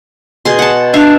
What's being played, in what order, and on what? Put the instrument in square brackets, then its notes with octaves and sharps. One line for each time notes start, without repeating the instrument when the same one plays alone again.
[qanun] B2 G#4 C6
F#5 A5
[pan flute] D4 [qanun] E5 F5